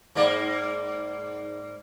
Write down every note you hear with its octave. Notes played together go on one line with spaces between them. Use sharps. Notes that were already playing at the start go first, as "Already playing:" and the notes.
G#2 A#3 D5